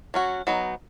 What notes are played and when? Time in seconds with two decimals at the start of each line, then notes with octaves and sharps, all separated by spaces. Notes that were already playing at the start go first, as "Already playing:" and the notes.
0.14 F#3 C#4 F#4
0.47 F#3 B3 D#4